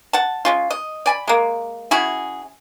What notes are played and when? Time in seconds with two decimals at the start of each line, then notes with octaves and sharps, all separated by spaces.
0.13 F#5 A5
0.45 G#3 C#4 F4
0.71 D#5
1.06 D5 G#5 B5
1.28 G#3 A#3
1.91 C#4 E4 F#4 G#4